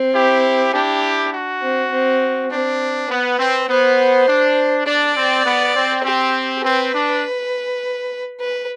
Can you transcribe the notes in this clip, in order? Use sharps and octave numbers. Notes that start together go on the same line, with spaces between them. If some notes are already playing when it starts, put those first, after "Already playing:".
Already playing: C4
E4 G4
D4 E4 G4
F#4
C4
C4
C4 D4
B3 B4
C4
B3 C5
D4
D4 D5
C4
B3
C4
C4 G4
C4 B4
D4
B4